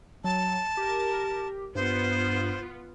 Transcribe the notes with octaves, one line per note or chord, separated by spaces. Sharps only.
F#3 A5
G4 A#4
G2 B3 F4 C5